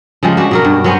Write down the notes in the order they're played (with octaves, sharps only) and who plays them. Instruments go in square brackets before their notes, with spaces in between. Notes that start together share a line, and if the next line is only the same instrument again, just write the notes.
[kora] C#3 F3 G3 G#3
D4 F#4 B4
B2 F#3 A#4
G2
F#3 B3 C#4 C5